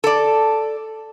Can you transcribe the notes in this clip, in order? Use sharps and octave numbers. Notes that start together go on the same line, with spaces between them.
A4 D5